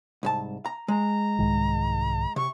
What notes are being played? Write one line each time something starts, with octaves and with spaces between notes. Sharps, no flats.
C2 G#2 A5
A#5
G#3 A#5
C2 G#2 D#3
C3 C#6